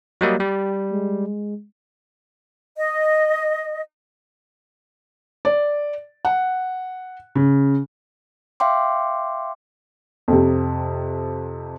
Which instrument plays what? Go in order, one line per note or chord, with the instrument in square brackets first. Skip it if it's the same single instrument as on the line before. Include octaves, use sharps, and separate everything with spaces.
[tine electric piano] F#3 G3 A#3 [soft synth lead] D#5
[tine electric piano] G3 [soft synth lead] G4
[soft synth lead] G#3
[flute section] D#5
[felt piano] D5
F#5
C#3
[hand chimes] E5 F5 G5 C6 D6
[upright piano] F2 C3